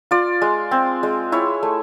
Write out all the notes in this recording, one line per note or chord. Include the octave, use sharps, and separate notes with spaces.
F4 D5
G#3
C4
G#3
E4 C#5
A3